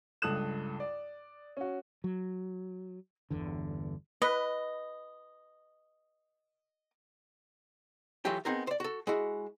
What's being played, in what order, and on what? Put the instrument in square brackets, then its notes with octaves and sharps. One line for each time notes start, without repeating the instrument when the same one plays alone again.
[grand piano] C#2 G2 A4 D#6 F#6 E7
D5
C#4 F#4
[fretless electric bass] F#3
G1 E2 D3
[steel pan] B4 [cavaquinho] D#5
[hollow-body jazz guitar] E3 F#3 A3 F4 G4 G#4
B3 C4 D#4 G#4 A#4
C5 D5
F#4 A4
G#3 E4 F#4